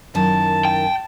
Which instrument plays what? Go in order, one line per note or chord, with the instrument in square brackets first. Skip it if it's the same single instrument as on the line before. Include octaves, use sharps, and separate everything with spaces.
[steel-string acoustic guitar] F#2 D#3 E4 [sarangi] A5
[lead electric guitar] G5